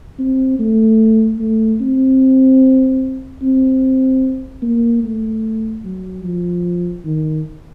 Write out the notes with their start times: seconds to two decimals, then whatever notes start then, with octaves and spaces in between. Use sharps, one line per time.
0.19 C4
0.59 A3
1.39 A3
1.80 C4
3.42 C4
4.62 A#3
5.04 A3
5.84 F#3
6.24 F3
7.05 D#3